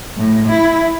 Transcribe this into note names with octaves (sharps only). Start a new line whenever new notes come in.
A2
E4